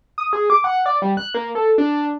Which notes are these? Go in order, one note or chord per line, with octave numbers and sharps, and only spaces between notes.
D#6
G#4
D6
F#5
D5
G3
F#6
A#3
A4
D4